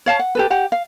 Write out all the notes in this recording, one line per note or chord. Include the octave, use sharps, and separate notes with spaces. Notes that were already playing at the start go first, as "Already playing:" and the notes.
C#5 F5 A5
F#5
G4 A4 B4
G4 F#5
F5